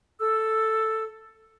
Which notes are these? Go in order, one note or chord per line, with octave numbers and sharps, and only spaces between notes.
A4 E6